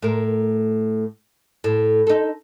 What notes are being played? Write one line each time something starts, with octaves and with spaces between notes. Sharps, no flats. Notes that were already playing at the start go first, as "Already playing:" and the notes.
A2 A#4
A2
D#4 A4